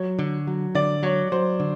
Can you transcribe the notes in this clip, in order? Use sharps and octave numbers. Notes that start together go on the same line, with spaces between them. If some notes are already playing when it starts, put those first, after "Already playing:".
Already playing: F#3 C#5
D3
F#3
D3 D5
F#3 C#5
F#3 C5
D3